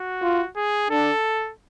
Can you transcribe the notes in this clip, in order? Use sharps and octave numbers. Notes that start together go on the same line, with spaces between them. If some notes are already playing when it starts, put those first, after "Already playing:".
Already playing: F#4
F4
G#4
D4 A4